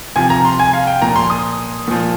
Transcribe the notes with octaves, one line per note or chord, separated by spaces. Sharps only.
C3 F3 G#5
A#5
C6
G#5
F5
G5
A#2 F3 A#5
C6
D#6
A#2 F3